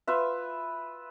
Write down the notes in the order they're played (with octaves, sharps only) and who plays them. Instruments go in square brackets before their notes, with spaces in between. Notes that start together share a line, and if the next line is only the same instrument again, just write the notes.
[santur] F4 B4 E5